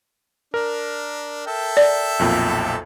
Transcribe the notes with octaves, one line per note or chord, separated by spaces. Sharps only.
D4 A#4
A4 E5 G5
D5
B1 F2 A#2